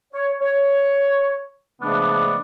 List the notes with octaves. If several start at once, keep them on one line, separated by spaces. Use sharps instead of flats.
C#5
C#5
C#3 F3 G#3 A3 B3 D4